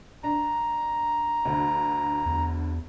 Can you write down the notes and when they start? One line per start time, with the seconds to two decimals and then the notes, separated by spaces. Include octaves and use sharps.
0.24 D4 A#5
1.45 D2 D3
2.26 E2